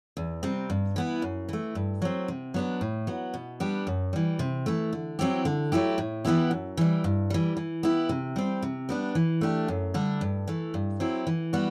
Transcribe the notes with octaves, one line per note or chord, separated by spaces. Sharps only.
E2
C3 G3 C4
G2
E3 B3 E4
F#2
E3 A3
G2
F#3 C4
C3
F#3 B3 D4
A2
F#3 B3
B2
G3 B3 D4 G4
F#2
E3 G3
C3
E3 A3
D3
F#3 C4 E4 G4
D3
F#3 A3 E4 G4
A2
E3 B3 E4 G4
F#2
E3 G3
G2
E3 G3
E3
B3 E4 G4
C3
G3 C4
C3
G3 B3 D4
E3
A3 D4 G4
F#2
D3 G3 D4
G2
E3 A3
G2
F#3 C4 E4 G4
E3
G3 B3 F#4